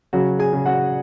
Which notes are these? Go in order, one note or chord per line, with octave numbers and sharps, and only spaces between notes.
C#3 F#3 F#4
G#4 G#5
C#3
F#4 F#5